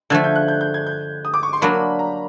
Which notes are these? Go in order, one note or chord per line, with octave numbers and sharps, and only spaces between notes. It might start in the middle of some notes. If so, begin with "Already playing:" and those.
D3 F3 A3 G#6
G6
F#6
G6
G6
G#6
G6
D#6
D6
C#6
C6
F#3 A#3 D4 B5
A#5